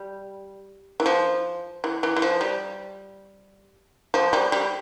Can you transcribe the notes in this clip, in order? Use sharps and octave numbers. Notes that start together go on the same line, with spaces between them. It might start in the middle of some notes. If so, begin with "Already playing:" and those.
Already playing: G3
E3
F3
E3
E3
E3
F3
G3
F3
G3
G3